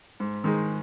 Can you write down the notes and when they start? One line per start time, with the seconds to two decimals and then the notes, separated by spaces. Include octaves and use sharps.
0.20 G#2
0.44 D#3 G#3 D#4 G#4